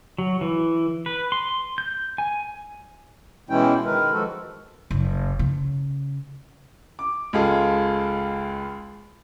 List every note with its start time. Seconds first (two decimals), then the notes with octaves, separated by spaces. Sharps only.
0.18 F#3
0.41 E3
1.06 B4
1.32 C6
1.78 G6
2.18 G#5
3.50 B2 E3 G#3 C#4 E4 G5
3.85 D#3 G#3 A#4 B4
4.12 E3 F3 G#3 F#4 A4
4.91 F#1
5.39 C#3
6.99 D6
7.33 C#2 G#3 F4 G#4 A4